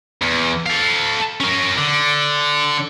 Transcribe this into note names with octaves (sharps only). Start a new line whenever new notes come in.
E2
A4 F5
C#4 A#4
D3